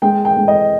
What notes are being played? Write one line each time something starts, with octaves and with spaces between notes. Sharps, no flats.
G#3 G5
G5
G#3
D#5